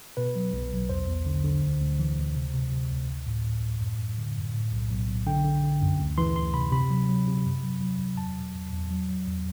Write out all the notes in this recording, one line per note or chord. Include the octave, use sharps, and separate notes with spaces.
B2 B4
F#3
B1
B1
E2 C5
E2
D3
D3
D2
D2
E3
D2
C3
C3
C3
D2
A1
A2
A2
A2
F#2
F#2
D3
F#2
A2
B1
B1
B1
D3 G5
D3
D3
F#2
D2
E3 C6
D2 C6
C3 B5
C3 B5
F#3
F#3
C3
F#2
F#3
F#3
F#3
E2 A5
B2
E2
E2
F#3
F#3
E2